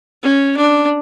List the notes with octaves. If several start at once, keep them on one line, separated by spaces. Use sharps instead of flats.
C#4
D4